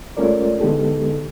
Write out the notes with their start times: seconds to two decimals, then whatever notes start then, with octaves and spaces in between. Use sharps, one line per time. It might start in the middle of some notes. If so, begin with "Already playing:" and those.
0.17 G#3 A3 C#4 F4 A#4 D5
0.60 D3 G#3 B3 D#4 G4 A4